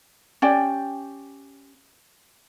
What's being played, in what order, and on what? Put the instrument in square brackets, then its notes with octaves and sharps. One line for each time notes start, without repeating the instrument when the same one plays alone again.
[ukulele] C#4 G4 D5 G5